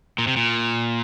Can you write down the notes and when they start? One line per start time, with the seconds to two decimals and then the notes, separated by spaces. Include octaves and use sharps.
0.18 A#2
0.27 C3
0.37 A#2